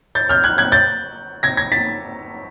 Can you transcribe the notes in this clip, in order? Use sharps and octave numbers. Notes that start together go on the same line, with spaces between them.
G6 A6
F6 G6
F#6 G#6
F#6 G#6
G6 A6
G#6 A#6
G#6 A#6
A6 B6